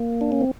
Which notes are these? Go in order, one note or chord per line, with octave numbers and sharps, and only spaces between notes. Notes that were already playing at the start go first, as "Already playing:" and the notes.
Already playing: A#3
D4
C#4
C4